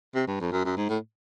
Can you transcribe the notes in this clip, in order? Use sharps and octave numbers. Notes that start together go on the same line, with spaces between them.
C3
G2
F2
F#2
F#2
G#2
A2